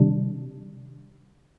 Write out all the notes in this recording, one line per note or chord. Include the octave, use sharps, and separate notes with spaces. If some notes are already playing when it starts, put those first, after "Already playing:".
Already playing: C3 D#3 G3 D4